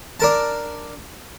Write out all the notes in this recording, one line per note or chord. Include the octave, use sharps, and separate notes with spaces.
D4 A#4 A5